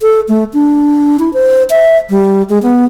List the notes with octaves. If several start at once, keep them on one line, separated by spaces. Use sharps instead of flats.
A4
A3
D4
E4
C5
E5
G3
G#3
B3